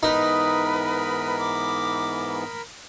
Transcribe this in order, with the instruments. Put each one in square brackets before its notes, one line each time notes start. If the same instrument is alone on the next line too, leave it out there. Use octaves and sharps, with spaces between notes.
[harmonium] G#2 E3 B3 [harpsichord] D#4 [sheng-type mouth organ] A#4 B5 [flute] B4
[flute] D6